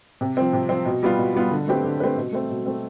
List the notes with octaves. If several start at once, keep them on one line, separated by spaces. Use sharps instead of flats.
C3
F3 C4
C3
F3 C4
B2
G3 B3 F4
B2
G3 B3 F4
D3
A3 C4 G4 B4
D3
A3 C4 G4 B4
B2
A3 C4
B2
A3 C4